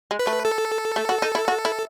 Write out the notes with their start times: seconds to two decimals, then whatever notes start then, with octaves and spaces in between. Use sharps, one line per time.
0.11 G#3
0.19 B4
0.27 A3
0.45 A4
0.96 A3
1.09 F#4
1.22 D#4
1.35 E4
1.48 F#4
1.65 E4